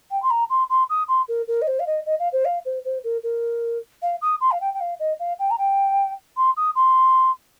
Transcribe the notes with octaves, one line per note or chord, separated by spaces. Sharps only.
G5
C6
A#5
C6
C6
D#6
C6
A#4
A#4
D#5
C5
F5
D#5
D#5
F5
C5
F5
C5
C5
A#4
A#4
F5
D#6
C6
F5
G5
G5
F5
D#5
F5
G5
A#5
G5
C6
D#6
C6